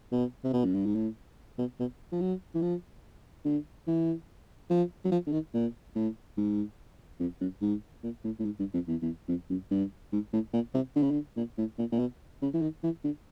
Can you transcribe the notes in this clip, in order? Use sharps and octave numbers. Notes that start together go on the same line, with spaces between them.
B2
C3
B2
F#2
G2
G#2
A2
B2
B2
F3
F#3
E3
F3
D3
E3
F3
F#3
F3
D3
D#3
A#2
A2
G#2
F2
F#2
G#2
A#2
A2
A2
G#2
G2
F2
E2
E2
F2
F#2
G2
G#2
A2
A#2
C3
D3
C#3
D3
A#2
A2
A#2
A#2
B2
C#3
E3
D#3
E3
D3